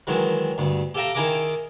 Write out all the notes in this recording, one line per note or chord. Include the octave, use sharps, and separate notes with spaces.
D#3 E3 F#3 G#3
D2 G2
G4 A4 E5 F5 G5 A#5
D#3 D#4 E4 G#4 A#4 D6